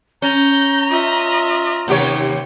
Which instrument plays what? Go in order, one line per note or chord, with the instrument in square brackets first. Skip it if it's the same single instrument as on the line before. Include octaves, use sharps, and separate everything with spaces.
[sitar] C#4 [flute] A#5 [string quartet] G6
[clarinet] F4 [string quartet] D#5 E5
[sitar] D#2 G4 C#5 [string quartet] C3